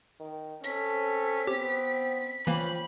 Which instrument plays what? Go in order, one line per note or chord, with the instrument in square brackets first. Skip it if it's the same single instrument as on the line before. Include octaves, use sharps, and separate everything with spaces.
[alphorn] D#3
[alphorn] C4 [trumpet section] C#4 A4 [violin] B6
[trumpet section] B3 [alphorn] C4 [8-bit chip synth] G4
[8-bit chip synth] E3 A#3 [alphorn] F3 [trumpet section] C#4 G5 [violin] B5